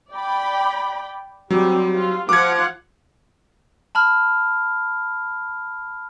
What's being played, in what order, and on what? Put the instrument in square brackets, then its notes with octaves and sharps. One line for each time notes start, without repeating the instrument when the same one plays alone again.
[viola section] D5 G5 B5
[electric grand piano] F#3 [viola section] G3 C4
[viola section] F4
[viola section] F3 F4 F#5 [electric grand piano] D6 G#6
[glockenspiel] A5 B5 F6